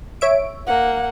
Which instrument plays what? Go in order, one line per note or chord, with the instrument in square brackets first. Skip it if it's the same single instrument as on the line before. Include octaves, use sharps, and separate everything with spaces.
[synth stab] C#5 E5 D7
[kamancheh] A#3 F#5